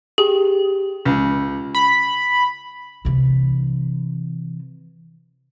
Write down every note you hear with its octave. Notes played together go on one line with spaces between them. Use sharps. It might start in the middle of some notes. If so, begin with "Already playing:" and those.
G4 G#4
C#2
B5
C3 E3